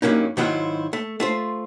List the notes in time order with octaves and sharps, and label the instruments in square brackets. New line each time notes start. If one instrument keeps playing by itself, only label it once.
[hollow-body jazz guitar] G2 F#3 A#3 C#4 D#4
G#2 D#3 F#3 E4 F4
A3
A3 F4 C5